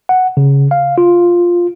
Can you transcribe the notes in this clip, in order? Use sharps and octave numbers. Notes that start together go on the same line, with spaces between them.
F#5
C#3
F5
F4